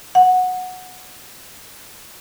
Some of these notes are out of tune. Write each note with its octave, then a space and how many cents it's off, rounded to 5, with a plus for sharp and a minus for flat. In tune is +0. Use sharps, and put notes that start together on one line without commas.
F#5 -10